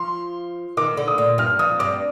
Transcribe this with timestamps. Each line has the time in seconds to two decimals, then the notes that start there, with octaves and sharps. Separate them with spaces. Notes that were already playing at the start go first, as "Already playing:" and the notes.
Already playing: F3 C6
0.77 D#3 D6
0.97 D3
1.08 D#6
1.18 A#2
1.38 G2 F6
1.59 F2 D#6
1.79 G2 D6